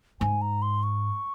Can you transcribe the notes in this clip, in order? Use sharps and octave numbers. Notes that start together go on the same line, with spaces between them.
G#2 G#5
A#5
C6
C#6